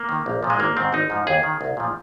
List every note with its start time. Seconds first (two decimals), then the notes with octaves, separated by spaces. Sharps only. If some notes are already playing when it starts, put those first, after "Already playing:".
Already playing: A#3
0.09 D#3
0.26 A#1
0.43 A#2 F3
0.50 G#3
0.59 G#1 A#3
0.77 G#2 D#3 C4
0.93 G#1 D#4
1.10 G#2 F3
1.27 D#2 G#4
1.43 D#3
1.61 C2
1.77 A#2 F3